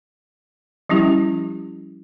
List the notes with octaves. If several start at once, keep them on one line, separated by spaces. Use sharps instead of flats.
F3 G3 C#4 E4 G4